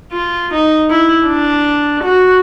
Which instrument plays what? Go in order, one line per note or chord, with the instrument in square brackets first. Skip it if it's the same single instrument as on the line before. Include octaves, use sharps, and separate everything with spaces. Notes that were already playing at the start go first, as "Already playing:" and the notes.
[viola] F4
D#4
E4
D4
F#4